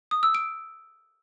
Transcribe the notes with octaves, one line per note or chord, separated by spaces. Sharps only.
D#6
E6
D7